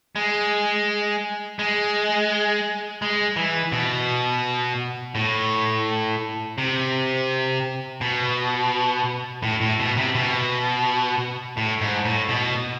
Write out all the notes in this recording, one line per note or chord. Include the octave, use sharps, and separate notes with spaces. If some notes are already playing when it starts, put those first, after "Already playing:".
G#3
G#3
G#3
E3
B2
A2
C3
B2
A2
A2
B2
C3
B2
A2
G#2
A2
B2